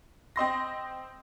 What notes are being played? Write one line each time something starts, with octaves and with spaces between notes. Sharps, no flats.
C4 D#5 C6 A#6